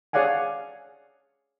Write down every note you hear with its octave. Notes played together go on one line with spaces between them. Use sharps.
G#4 C#5 D5 F5 F#5 G#5